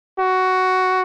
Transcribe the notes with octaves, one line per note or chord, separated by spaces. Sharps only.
F#4